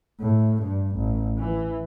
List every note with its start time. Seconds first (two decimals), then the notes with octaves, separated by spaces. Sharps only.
0.20 A2
0.62 G2
0.96 A1
1.38 E3